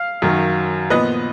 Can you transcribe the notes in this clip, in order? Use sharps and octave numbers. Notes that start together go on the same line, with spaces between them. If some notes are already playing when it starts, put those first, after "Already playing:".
Already playing: F5
F#2 D#3 F#3
A#2 F3 B3 B4 D#5